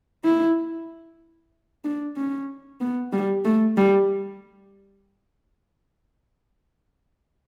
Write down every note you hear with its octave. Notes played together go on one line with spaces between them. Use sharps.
E4
D4
C#4
B3
G3
A3
G3